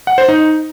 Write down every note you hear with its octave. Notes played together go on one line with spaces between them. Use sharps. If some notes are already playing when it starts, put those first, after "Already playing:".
F#5
C5
D#4